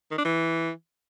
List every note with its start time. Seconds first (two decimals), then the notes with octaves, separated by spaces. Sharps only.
0.11 D#3
0.18 D4
0.25 E3